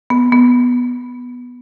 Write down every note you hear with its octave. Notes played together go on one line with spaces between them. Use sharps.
B3
B3